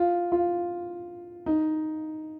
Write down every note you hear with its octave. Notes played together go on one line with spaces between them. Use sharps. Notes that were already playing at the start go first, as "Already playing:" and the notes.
Already playing: F4
F4
D#4